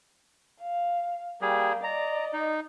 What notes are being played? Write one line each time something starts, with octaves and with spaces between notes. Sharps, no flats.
F5
G3 A#3 G#4 G5
D5 D#5 A#5
D#4